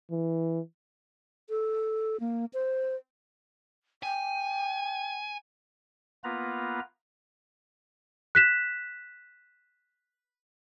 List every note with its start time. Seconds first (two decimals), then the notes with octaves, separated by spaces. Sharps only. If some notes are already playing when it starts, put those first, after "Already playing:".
0.11 E3
1.50 A4
2.20 A#3
2.53 C5
4.03 G5 G#5
6.24 A#3 B3 F4 B4 A#5
8.35 F#6 B6 E7